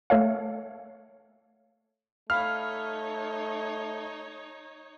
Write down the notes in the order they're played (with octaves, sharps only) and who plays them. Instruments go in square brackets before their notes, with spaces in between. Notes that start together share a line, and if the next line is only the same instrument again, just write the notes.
[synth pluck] A3 A4 C#5 F5
[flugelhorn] A3 [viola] D#4 C#5 [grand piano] F5 B5 [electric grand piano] F6